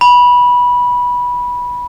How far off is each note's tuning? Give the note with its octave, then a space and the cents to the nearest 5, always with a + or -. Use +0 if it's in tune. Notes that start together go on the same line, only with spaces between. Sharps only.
B5 -15